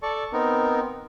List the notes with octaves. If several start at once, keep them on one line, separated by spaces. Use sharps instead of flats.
A4 D5 A5 C#6
B3 C4 D#4 A#4